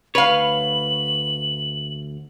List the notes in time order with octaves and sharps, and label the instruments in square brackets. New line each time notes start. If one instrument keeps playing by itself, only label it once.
[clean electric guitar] D2 C#5 [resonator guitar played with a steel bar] B4 F5 [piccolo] F#7